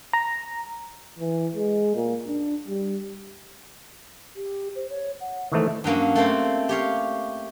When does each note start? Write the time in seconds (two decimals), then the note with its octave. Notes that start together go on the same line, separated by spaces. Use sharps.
0.13 A#5
1.19 E3
1.56 G#3
1.95 A#2
2.27 D4
2.67 G3
4.36 G4
4.75 C5
4.90 C#5
5.20 F#5
5.52 D#3 E3 A3 C5
5.84 G2 F#3 A#3 C#4
6.15 A3 A#3 C4 C5
6.69 G4 C#5 F5